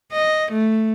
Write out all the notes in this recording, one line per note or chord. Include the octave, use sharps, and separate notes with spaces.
D#5
A3